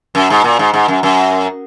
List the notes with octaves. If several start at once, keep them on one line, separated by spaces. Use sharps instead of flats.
F#2
G#2
A#2
G#2
G#2
F#2
F#2